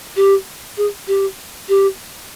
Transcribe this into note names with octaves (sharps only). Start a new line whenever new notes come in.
G4
G#4
G4
G4